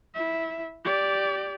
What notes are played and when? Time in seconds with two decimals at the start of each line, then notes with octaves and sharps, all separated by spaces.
0.15 E4 E5
0.85 G4 D5